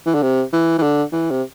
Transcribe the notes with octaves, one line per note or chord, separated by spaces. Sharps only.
E3
D3
C3
E3
E3
D3
E3
C3